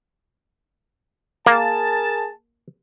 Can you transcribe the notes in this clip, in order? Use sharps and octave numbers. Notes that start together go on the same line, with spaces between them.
A#3 G#4 A#4 A5